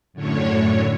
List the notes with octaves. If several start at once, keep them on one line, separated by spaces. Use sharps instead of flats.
F#2 A2 D3 C#5